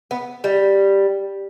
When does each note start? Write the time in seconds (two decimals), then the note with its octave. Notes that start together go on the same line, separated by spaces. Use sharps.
0.11 B3
0.44 G3